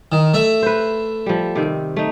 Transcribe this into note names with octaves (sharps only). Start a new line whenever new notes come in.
D#3
A3 E5
B4 C5
F3 G3
C3 D#3 C4
A3 D#4